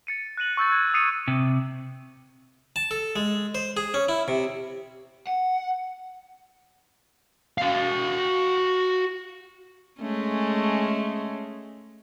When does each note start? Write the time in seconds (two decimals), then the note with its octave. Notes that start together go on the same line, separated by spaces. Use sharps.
0.07 A6 C#7 D#7
0.37 F#6 A#6 D#7 F#7
0.57 C#6 E6 G6 A6
0.72 G#6
0.94 D#6 C7 C#7 D#7
1.28 C3
2.76 A5
2.91 A4
3.16 G#3
3.55 C5
3.77 G#4
3.94 C#4
4.09 E4
4.28 C3
5.27 F#5
7.58 F#4 F5
10.01 G#3 A3 C#4